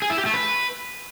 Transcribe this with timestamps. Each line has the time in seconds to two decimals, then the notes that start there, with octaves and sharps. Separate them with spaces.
0.02 G#4
0.10 E4
0.18 G4
0.26 A3
0.34 B4